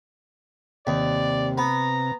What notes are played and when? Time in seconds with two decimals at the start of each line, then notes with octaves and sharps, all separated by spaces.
0.87 D#2 C3 D5
1.58 B3 A#5